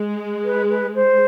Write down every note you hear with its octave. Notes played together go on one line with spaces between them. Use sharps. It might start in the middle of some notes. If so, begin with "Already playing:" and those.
Already playing: G#3
B4
B4
C5